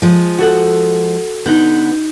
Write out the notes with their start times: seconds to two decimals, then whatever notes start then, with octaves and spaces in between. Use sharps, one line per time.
0.02 F3 G#3
0.38 F#4 A4 F#5
1.46 D3 B3 D#4 F#6 G6